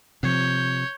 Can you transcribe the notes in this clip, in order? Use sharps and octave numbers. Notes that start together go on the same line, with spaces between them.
C3 F3 C#5 G6